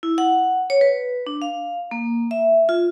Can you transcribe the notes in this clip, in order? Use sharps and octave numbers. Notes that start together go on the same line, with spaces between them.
E4
F#5
C#5
B4
D4
F5
A#3
E5
F4